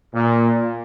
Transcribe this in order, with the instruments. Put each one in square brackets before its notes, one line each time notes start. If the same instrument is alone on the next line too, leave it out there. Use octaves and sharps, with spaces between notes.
[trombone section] A#2